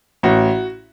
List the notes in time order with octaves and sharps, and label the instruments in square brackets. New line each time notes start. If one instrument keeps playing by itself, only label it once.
[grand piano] A1 F#4